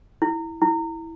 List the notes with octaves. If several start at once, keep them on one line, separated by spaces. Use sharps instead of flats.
E4
E4